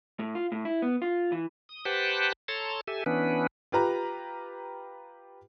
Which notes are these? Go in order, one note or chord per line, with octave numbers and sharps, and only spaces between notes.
A2
F4
A2
E4
B3
F4
E3
D#6
G4 B4 C5 F#5 G5 A5
A4 C#5 A5 A#5 C6
G4 A4 E5 G#5
E3 B3 C#4 D4 B4
F4 G4 B4 A#5